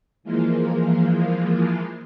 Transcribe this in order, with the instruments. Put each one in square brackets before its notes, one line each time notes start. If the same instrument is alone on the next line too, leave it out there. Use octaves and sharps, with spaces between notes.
[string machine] E3 F3 G#3 A#3 F4